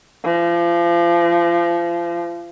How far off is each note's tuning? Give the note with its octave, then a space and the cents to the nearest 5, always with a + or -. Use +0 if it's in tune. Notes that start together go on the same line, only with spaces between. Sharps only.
F3 -30